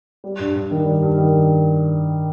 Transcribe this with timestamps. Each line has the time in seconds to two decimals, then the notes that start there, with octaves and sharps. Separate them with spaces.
0.24 G3
0.39 G2
0.55 G2
0.71 D#3
0.86 G3
1.02 G2
1.18 D#3